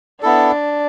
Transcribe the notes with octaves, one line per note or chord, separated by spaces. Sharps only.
B3 D4 E4 A4